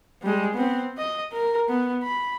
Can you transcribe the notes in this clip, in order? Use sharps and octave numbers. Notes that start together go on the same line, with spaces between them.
G3 G#3
B3 C4
D#5
A#4
B3
B5